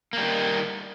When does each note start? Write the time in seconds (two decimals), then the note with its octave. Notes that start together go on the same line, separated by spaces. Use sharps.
0.13 A#3
0.18 G3
0.22 D#3